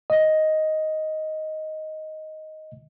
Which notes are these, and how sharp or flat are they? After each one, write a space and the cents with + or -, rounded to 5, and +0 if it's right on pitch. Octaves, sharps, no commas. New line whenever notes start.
D#5 +5